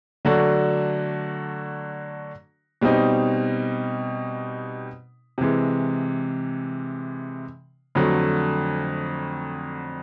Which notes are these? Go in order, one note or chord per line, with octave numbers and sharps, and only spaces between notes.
D3 F#3 A3 D4 F#4
B2 G3 C4 D#4
C3 E3 G#3
F2 D3 F#3 A3